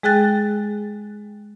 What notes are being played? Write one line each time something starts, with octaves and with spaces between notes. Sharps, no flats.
G#3 G#4 G5 F#6 A6